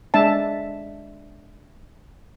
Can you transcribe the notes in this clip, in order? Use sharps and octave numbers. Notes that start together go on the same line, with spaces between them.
G#3 D4 E5 A5